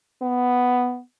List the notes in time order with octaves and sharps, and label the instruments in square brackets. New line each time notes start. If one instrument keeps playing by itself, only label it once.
[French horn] B3